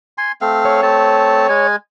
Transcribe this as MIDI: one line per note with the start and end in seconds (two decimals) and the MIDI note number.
0.18 0.32 80
0.18 0.32 84
0.41 0.81 57
0.41 0.81 60
0.41 0.81 77
0.65 1.67 73
0.83 1.47 57
0.83 1.47 60
0.83 1.47 81
1.49 1.76 56
1.49 1.76 80